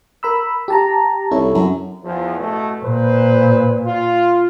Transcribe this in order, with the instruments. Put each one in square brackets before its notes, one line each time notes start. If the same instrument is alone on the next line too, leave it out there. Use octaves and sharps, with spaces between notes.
[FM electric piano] A#4 B5 E6
G4 A5 A#5
[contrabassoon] C2 [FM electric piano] E4 A4 C#5
[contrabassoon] F#2
[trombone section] E2 F3
A1 B2 A3
[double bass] A#2 [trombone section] B4 C5
[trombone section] F4